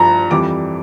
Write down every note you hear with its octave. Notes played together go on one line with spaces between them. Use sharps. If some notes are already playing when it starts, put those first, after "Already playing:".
Already playing: G2 F3 A#5
F2 E3 G3 D6